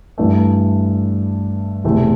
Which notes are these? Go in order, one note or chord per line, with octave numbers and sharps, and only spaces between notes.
G2 E3 A3
E1 E2 C3 E3 A3